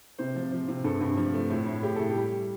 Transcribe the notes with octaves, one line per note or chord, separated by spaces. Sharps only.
C3 C5
F3
F3
C3
G2 A4
G2
F3
A3
A2
A2
A2 G4
A2 A4
G4
G3